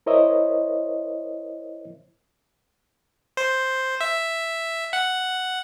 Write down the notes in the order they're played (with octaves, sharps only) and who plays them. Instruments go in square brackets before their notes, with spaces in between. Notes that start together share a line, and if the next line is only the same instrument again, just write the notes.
[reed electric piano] E4 A#4 C5 C#5 D#5 E5
[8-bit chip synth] C5
E5
F#5